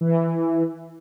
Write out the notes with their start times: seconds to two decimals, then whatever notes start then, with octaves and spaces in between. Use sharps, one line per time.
0.01 E3